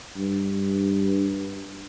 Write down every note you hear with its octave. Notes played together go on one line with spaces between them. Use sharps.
G2